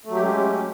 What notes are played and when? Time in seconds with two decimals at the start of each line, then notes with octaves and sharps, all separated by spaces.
0.05 A3
0.10 F#3
0.15 G4
0.20 G#3
0.24 C#4